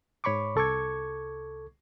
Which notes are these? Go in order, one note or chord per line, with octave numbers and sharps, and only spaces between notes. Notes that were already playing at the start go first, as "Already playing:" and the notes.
G#2 C#5 B5 C#6 D6
C2 A4 C#6 D6 G#6